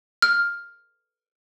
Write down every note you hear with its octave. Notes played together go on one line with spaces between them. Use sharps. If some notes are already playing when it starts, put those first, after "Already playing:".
F6